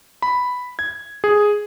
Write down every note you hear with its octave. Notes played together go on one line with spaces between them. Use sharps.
B5
G#6
G#4